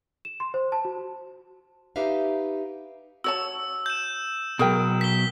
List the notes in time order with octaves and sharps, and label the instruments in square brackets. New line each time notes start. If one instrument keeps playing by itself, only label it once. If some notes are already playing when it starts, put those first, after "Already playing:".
[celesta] E7
C6
C5
A5
F#4
[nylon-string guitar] D#4 G4 B4 E5 F5
[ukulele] F#4 C#5 A5 [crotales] E6
[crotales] G6 E7
[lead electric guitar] B2 F#3 [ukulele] G#4 A#4 G5
[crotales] B6 G7